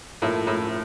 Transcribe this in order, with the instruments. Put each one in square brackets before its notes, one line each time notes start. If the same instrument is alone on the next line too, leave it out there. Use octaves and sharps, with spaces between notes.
[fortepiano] A2 [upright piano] F3 A#3 F4 A4 E5
[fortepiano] A2